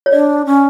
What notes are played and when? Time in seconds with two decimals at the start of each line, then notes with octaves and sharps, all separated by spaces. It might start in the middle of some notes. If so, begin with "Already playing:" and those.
0.06 C#5
0.12 D4 D5
0.46 C#4